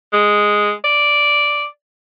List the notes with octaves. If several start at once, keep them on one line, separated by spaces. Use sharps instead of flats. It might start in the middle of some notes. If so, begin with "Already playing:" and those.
G#3
D5